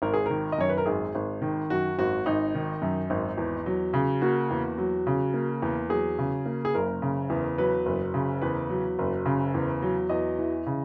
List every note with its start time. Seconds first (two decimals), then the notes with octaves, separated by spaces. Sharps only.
0.02 G#1 A#4
0.14 G#4
0.26 D#3 A#4
0.52 D#5
0.58 F#2 C#5
0.69 B4
0.78 A#4
0.86 G#1 G#4
1.15 G#1
1.42 D#3
1.70 F#2 F#4
1.99 G#1 F#4
2.26 G#1 D#4
2.55 D#3
2.82 F#2
3.10 G#1
3.38 E2
3.66 F#3
3.94 C#3
4.22 A#3 F#4
4.51 E2
4.78 F#3
5.07 C#3
5.34 A#3
5.62 E2
5.90 F#3 G#4
6.19 C#3
6.46 A#3
6.65 G#4
6.75 F#1 A#4
7.02 C#3
7.30 E2
7.58 F#3 B4
7.86 F#1
8.14 C#3
8.42 E2 B4
8.70 F#3
8.99 F#1
9.26 C#3
9.54 E2
9.82 F#3
10.09 E2 D#5
10.39 E3
10.67 C#3